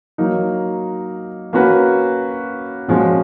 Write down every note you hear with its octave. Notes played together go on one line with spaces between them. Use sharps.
F#3 A#3 D#4
A#3 C#4 F#4 B4
A#2 F3 G#3 C#4 F#4